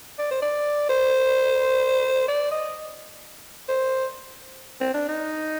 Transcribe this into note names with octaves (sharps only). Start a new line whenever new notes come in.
D5
C5
D5
C5
D5
D#5
C5
C4
D4
D#4